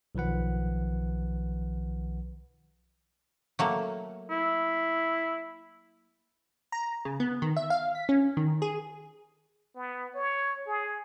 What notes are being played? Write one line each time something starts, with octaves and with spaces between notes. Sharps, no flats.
B1 D#3 F3 B4 F#5
F#3 A3 A#3
E4
A#5
C#3
B3
D#3
E5
F5
B6
C#4
D#3
G#4
B3
C#5
G#4